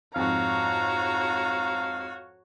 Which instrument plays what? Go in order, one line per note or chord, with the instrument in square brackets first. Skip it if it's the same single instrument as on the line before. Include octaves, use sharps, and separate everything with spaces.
[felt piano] F2 G#2 [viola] F#4 C#5 [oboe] F5 [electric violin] A#5